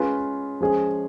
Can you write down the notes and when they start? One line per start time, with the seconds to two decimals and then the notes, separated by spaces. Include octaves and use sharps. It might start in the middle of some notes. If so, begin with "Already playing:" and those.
Already playing: G#3 C#4 F4 G#4 B4
0.61 F3 G#3 C#4 G#4